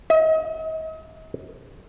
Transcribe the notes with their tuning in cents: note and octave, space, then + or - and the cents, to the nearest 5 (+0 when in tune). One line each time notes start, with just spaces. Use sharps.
D#5 +40